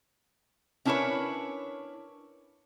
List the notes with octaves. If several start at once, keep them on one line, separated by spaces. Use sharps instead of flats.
C#4 D4 E4 A#4 B4 C#5